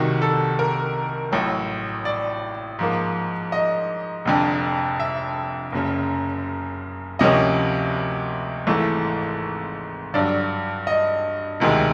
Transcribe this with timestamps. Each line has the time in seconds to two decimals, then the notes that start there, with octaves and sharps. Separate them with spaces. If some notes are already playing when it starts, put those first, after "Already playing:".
Already playing: C2 C3 D#3 F#4
0.22 A4
0.59 A#4
1.32 A1 A2 F#3
2.05 D5
2.79 G#2 F3 A#3
3.52 D#5
4.25 F1 F2 D3
5.00 E5
5.72 F#1 F#2 C#3
7.19 D2 C3 F3 A#3 C#4 D#5
8.67 G#1 G#2 E3 A3
10.14 G2 D3 F#3 D5
10.87 D#5
11.60 E1 D2 C3 D#3 G#3